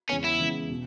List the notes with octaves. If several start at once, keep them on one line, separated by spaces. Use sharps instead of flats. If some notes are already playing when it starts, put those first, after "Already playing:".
E2 C#3 G#3 B3 C#4
E4
E2 C#3 G#3 B3
B2